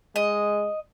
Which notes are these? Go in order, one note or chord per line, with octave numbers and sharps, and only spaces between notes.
G#3 D#5